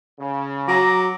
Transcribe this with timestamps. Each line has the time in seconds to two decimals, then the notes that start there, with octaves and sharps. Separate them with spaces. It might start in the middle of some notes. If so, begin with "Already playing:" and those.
0.19 C#3
0.68 F#3 A#5 D6